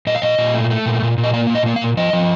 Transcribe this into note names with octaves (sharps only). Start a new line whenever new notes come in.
A#2 D#5
F5
A#2 D#5
A#2
A3
A3
A#2
A#2
A#2
D#5
A#3 D5
A#2
D#5
A#3
F5
A#2
F3 D#5
F3